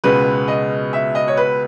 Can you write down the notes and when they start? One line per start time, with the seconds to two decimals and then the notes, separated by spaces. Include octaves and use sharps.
0.04 C#2 B2 G#3 B3 B4
0.48 D#5
0.93 E5
1.15 D#5
1.28 C#5
1.37 B4